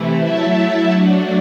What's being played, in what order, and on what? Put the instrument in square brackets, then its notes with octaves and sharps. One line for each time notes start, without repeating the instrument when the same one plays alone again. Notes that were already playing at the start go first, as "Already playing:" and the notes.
Already playing: [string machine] C3 E3 A3 E4
F#3 A3 E4 A4 E5
F#3 A3 D4 F#4